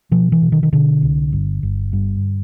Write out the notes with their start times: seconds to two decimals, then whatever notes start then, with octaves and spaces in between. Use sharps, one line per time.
0.11 B2 F3
0.32 E3
0.42 B2
0.52 D#3
0.63 D#3
0.73 B2 D3
1.02 C2
1.32 G1
1.63 G1
1.93 G2